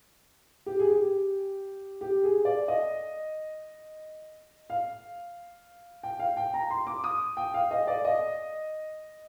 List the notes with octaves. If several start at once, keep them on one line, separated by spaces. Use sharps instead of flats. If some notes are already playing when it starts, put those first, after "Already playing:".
G4
G#4
G4
G4
G#4
D5
D#5
F5
G5
F5
G5
A#5
C6
D6
D#6
G5
F5
D#5
D5
D#5